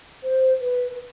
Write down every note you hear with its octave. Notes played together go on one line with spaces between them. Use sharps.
C5
B4